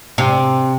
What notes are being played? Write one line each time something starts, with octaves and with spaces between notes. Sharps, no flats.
C3